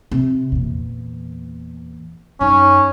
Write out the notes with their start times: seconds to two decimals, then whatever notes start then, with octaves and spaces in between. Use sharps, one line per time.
0.11 C3
0.52 E2 A#2
2.41 F#2 C#4 D#4